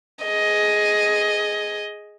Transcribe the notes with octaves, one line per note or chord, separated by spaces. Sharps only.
G#4 D#5